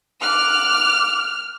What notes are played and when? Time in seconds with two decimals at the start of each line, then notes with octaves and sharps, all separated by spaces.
0.22 D6 F6 F#6